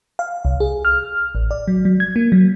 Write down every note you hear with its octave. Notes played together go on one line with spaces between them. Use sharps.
F5
C2
G#4
F6
A1
D5
F#3
F#3
G#6
A#3
F#3